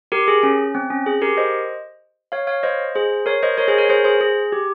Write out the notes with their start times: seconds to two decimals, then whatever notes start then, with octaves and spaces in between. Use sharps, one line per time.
0.12 G4 A#4
0.28 G#4
0.43 C#4
0.75 C4
0.90 C#4
1.06 G#4
1.22 G4 A#4
1.37 C5 D#5
2.32 C#5 F5
2.47 C#5 F5
2.63 C5 D#5
2.95 G#4 C5
3.26 A#4 C#5
3.43 C5 D#5
3.58 A#4 C#5
3.68 G#4 C5
3.78 A#4 C#5
3.89 G#4 C5
4.04 G#4 C5
4.21 G#4
4.52 G4